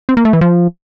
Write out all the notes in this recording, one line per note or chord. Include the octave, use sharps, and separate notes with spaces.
C4
A#3
A3
E3
F3